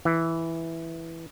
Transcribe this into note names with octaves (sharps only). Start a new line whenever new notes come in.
E3